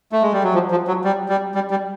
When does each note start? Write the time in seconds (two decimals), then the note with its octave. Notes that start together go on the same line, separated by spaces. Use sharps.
0.12 A3
0.22 G#3
0.33 G3
0.44 F#3
0.54 F3
0.71 F3
0.88 F#3
1.04 G3
1.29 G3
1.55 G3
1.71 G3